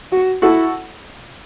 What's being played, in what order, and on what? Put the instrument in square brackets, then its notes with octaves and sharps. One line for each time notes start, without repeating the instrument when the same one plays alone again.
[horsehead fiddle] F#4
[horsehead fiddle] E4 [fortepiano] F#4 A4